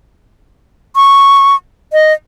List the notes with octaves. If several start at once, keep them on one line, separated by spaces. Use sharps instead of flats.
C#6
D#5